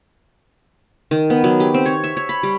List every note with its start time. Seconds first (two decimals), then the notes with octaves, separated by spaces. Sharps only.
1.11 D#3
1.30 B3
1.44 F#3
1.60 G4
1.74 C4
1.86 C#5
2.04 E5
2.17 C#5
2.29 B5
2.43 G3